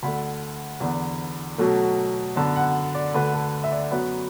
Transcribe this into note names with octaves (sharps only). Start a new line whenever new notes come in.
D2 D3 A3 B5
E2 D3 B3
B2 F#3 A3
F#2 D3 B3 A5
F#5
D5
D2 D3 A3 B4
A4
E5
D5
F#2 F#3 B3 B4